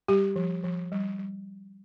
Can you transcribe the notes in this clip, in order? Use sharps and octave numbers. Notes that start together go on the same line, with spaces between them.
G3 G4
F3
F3
G3
G3